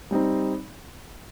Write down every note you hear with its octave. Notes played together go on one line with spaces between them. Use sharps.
G3 C4 D#4